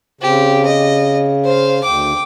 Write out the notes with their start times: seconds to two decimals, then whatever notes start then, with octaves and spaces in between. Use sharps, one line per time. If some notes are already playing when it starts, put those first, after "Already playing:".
0.21 C#3 C4 G4
0.66 D#5
1.44 C5 F5
1.84 D2 G5 D6